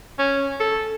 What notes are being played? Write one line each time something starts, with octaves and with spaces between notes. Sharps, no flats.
C#4
A4